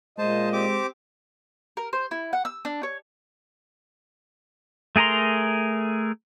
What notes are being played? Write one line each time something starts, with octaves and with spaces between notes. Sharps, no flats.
A#2 G#3 C5 D#5 A5
C4 G4 D6
A#4
C5
E4
F#5
E6
D4
C#5
A3 G#4 A#4 A#5 C6